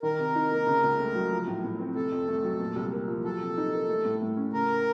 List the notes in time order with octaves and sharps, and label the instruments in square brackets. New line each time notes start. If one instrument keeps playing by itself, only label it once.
[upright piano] D#3 [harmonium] A#4
[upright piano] C3
D#4
A#3
C#3
C#2
A3
F#3
F3
A2
A2
C4
[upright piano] C3 [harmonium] A4
[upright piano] F2
A3
F#3
A#2
C2
A#3
F3
[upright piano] F#3 [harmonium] A4
[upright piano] C3
D#4
A#3
A3
A2
A2
C#4
[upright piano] C#3 [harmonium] A#4